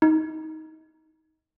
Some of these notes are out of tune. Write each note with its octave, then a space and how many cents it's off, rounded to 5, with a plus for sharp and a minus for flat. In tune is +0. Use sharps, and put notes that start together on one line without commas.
D#4 +20